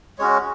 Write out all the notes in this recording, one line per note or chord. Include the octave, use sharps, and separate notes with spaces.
G#3 C#4 F#4 C#5